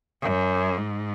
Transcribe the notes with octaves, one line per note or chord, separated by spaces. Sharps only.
F#2
G#2